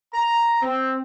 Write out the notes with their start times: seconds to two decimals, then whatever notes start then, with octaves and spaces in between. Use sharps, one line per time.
0.14 A#5
0.62 C4